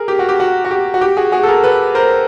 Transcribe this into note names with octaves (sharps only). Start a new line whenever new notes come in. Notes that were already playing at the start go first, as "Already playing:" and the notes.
Already playing: G#4 A#4
G4
F#4
G4
F#4
F#4
G4
F#4
G4
F#4 G#4
F#4 G#4
A4
G#4 A#4
A4 B4
A#4 C5